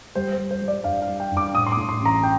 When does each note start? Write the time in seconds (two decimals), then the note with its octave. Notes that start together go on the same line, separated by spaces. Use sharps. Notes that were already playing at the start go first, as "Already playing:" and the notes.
0.15 G3 C5
0.33 G3 C5
0.51 C5
0.62 G3
0.68 D5
0.84 G2 F5
1.02 F5
1.08 G3
1.20 G5
1.32 G2
1.37 D6
1.54 A2 D#6
1.67 C6
1.72 D6
1.77 A2
1.89 C6
2.00 A1 A#5
2.23 G5